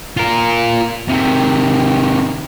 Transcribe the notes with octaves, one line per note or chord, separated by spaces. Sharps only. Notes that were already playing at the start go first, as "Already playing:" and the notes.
F4 A#4
C3 D#3